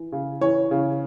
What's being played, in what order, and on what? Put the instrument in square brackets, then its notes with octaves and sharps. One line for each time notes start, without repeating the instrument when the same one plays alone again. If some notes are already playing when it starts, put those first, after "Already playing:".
Already playing: [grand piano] E3
C#3
E3 C#5
C#3